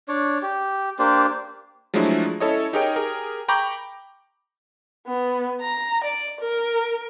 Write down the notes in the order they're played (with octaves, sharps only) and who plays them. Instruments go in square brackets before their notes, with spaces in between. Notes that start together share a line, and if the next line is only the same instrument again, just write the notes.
[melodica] D4 C#5
G4
A#3 D4 G4 C5
[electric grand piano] F3 F#3 G#3 A3 D4 E4
C#4 E4 A4 C#5 D#5
D#4 G4 G#4 A#4 C#5 G5
G4 G#4 A#4
G5 A#5 B5 C#6 D6 G6
[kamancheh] B3
A#5
D5
A#4